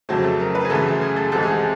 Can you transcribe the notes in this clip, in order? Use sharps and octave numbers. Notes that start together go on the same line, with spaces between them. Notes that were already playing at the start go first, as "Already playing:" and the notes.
F2 C#3 F#3 A3 C5
A4
A#4
B4
G#4
F#2 C#3 E3 A3 A4
G#4
A4
C2 C3 E3 G#3 A4
G#4